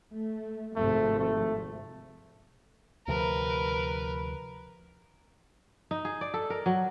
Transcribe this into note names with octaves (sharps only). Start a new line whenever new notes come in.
A3
G#1 C3 F3 A3
A3
D2 C3 F3 A#4 B4
D#4
G#4
D5
A4
A#4
F#3